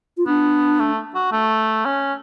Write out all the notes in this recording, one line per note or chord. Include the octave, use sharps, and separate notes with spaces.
F4
B3 D4
A3
F#4
A3
C#4